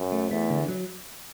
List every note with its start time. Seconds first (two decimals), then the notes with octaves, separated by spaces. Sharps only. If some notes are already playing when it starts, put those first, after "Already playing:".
Already playing: F#2
0.12 A3
0.30 E2 A3
0.50 D3
0.68 F#3